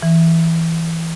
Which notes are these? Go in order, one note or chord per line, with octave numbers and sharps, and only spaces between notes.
E3